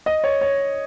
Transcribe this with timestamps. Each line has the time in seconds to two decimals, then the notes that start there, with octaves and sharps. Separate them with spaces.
0.06 D#5
0.24 C#5
0.41 C#5